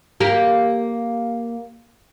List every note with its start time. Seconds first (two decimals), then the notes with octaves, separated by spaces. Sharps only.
0.20 A#3 G4 A#4